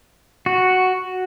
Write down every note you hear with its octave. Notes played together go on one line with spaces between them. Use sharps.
F#4